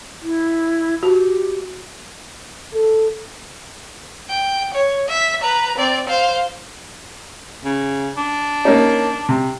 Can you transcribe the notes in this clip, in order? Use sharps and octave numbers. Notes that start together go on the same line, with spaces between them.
E4
F#4 G4
A4
G5
C#5
E5 B6
B4 A#5
C4 D5
C5 F5
C#3
D4
A#3 C#4 D#4
C3